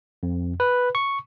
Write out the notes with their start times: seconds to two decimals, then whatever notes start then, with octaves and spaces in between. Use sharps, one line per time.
0.23 F2
0.60 B4
0.95 C#6